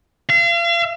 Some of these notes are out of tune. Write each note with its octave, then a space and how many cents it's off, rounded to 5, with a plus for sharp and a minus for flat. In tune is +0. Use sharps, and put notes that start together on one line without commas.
F5 -40